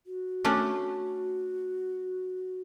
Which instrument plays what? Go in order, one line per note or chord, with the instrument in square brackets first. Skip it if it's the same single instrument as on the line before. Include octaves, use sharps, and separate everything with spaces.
[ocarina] F#4
[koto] A3 C#4 D4